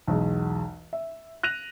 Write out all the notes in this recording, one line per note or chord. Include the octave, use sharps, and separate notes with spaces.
B1 E2 G#3
E5
F#6 A#6 D#7 F7